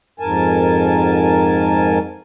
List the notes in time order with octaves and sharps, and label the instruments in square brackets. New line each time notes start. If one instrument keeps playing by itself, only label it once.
[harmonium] F2 G#2 A#4 G#5 A5